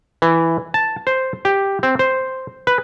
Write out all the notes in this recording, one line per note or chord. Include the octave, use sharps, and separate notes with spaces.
E3
A5
C5
G4
C4
C5
B4